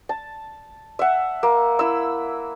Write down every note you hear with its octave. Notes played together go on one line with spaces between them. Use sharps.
A5
E5 F#5
A#3
E4 E6